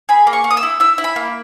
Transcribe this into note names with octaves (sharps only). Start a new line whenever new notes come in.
G#4 B5
A#3
C#6
A#3
D#6
E6
E4
E4 E6
E4
B5
A#3